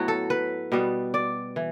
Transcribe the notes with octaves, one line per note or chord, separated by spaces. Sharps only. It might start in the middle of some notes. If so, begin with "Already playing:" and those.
Already playing: A2 F#3 B3 F#4
A4
B4
B2 G3 B3
D5
E3